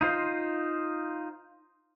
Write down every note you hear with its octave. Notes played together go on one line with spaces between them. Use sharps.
D#4 F4 C5